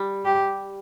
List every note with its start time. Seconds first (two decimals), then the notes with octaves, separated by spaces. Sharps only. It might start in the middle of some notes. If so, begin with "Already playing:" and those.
Already playing: G3
0.25 G4